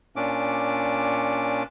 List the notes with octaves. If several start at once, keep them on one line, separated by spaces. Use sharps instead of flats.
A#2 C#4 D4 D6